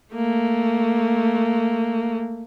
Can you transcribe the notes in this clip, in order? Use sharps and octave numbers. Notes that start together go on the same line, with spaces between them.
A3 A#3